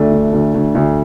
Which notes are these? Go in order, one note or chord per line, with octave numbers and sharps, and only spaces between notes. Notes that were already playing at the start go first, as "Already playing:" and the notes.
Already playing: D2 A3 D4
D3
D2
D2
D2